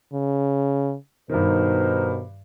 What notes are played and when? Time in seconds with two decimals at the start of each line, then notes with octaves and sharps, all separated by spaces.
0.13 C#3
1.30 G2 B2 D#3 D#4 A#4 C5